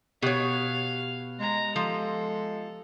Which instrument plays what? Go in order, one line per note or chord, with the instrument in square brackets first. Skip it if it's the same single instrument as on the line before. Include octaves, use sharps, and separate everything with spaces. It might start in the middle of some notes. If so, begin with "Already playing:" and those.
[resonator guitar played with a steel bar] B2 C#5 [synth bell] B3 G4 F#6 [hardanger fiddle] F5
[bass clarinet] G#3 [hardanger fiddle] A#5
[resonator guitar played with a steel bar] F3 [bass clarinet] G#3 [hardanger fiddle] A4